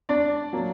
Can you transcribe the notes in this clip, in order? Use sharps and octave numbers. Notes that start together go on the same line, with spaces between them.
D4 D5
F#3 A#3